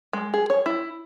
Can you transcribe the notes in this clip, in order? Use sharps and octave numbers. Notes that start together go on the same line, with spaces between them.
G#3
G#4
C#5
E4